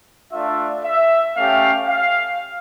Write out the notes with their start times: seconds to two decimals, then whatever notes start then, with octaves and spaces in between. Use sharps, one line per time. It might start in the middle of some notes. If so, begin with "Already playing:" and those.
0.33 A3 D4 F4 E5
0.84 E5
1.36 A3 C#4 G4 F5
1.88 F5